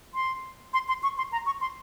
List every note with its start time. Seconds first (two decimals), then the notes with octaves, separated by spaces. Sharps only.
0.14 C6
0.74 C6
0.88 C6
1.03 C#6
1.18 C6
1.32 A#5
1.46 C#6
1.61 C6